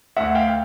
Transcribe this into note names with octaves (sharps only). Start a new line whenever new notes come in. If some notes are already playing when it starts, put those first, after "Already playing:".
D2 E5 F#5
F5 G5